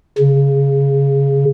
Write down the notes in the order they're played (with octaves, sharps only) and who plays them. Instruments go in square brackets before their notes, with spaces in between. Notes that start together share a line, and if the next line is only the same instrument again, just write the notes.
[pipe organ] C#3